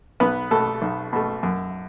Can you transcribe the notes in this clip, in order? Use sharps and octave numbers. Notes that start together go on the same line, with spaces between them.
B1 B3 B4
B2 A3 A4
B1
B2 A3
F#2